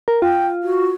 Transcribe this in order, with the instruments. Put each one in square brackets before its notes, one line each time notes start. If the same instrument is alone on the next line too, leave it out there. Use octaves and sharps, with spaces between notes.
[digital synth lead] A#4
[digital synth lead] F4 [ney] G5
[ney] F#4